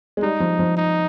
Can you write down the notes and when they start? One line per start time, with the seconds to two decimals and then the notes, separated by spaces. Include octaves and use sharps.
0.17 G#3
0.22 G3 D#4
0.40 F3
0.59 F3
0.77 D#4